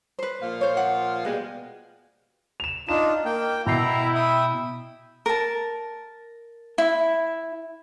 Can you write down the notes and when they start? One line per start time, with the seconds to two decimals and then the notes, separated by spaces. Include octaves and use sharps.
0.19 B4 C5
0.41 A#2 F3 F5
0.61 C5 C#5
0.77 F#5
1.25 B2 G3 G#3 B4
2.60 E7 F7
2.89 D4 D#4 F4 D#5 E7
3.25 A#3 G5
3.66 B2 E4 G5 A#5 C7
4.15 E5 G5 D#6
5.26 A#4 A5
6.78 E4